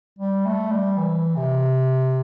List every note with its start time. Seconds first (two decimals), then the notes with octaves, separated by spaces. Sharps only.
0.19 G3
0.46 A3
0.71 G3
0.97 E3
1.36 C3